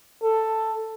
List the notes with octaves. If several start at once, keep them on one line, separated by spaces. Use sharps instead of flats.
A4